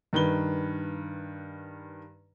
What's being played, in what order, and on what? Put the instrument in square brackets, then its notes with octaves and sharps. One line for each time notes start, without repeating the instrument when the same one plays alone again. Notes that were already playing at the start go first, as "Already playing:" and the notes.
[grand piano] G2 D#3 B4 G7